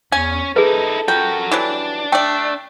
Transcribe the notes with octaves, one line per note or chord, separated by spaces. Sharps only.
E2 C#4 G#5
D#4 E4 G#4 A4 B4
F4 F#4 A#4 G5
E3 F#3 G3 D4
A3 D5 G5